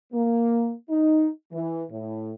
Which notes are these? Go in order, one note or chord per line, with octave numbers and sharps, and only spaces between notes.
A#3
D#4
E3
A2